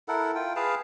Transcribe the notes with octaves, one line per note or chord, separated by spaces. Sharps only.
E4 A4 A#4 F#5
F4 G5
G#4 B4 F5 A5